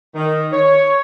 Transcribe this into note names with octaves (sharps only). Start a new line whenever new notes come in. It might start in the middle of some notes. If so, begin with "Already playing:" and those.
D#3
C#5